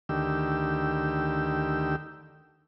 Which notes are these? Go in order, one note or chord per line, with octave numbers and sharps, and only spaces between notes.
D2 D#3 G4 E6